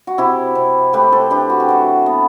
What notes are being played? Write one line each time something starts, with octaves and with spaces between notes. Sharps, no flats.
F#4
C3 E4 G4
C3
A3 G4 B4
A4 C5
D4 G4 B4
F#4
G4
E3 F#4
B3